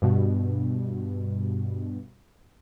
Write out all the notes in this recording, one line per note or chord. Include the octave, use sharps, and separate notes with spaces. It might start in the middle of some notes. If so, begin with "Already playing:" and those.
G2 B2